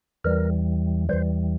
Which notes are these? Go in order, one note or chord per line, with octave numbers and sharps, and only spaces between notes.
E2 E3 G3 A#4
E2 E3 G3 C5